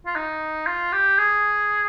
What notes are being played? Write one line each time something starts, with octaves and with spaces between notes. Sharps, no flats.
F4
D#4
F4
G4
G#4